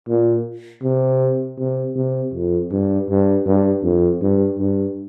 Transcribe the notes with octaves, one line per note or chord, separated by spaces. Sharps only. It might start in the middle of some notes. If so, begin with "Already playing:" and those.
A#2
C3
C3
C3
F2
G2
G2
G2
F2
G2
G2